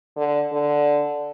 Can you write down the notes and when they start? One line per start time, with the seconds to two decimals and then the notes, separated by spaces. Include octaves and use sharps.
0.17 D3
0.52 D3